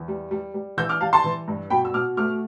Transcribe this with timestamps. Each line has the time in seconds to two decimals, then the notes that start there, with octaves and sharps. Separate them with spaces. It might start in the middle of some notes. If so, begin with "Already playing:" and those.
Already playing: E2
0.08 G3
0.31 G3
0.54 G3
0.77 E3 E6 G6
0.89 D6 F6
1.01 G3 F5 A5
1.13 A5 C6
1.24 E3
1.48 G2
1.70 B2 G5 B5
1.85 E6
1.94 B2 D6 F6
2.17 A3 D6 F6